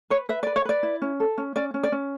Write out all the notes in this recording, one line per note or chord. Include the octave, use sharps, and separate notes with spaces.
B4 C#5
B4 E5
B4 D5
C#5
B4 D5
E4
C#4
A4
C#4
C#4 D5
C#4
D5
C#4